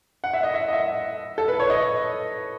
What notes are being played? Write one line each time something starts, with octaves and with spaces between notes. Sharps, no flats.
F#5
E5
D#5
E5
D#5
E5
A4
B4
C#5
D#5